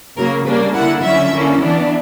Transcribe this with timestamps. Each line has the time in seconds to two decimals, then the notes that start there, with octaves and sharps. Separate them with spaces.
0.16 C#3 F#3 A#3 A#4
0.46 C#3 G3 A#3 D4 B4
0.74 D3 A#3 E4 F#5
1.02 D3 F#3 C#4 E4 E5
1.31 D3 A#3 C#4 E4
1.60 E3 B3 D4